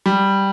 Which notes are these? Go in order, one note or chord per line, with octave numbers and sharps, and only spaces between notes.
G3